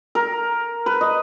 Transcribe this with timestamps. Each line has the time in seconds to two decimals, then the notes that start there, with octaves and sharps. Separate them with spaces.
0.15 A#4
0.86 B4
1.01 D#5